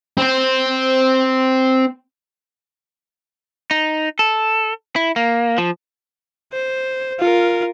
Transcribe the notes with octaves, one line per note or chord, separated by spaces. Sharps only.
C4 C5
D#4
A4
E4
A#3
F3
C5
F4 A#4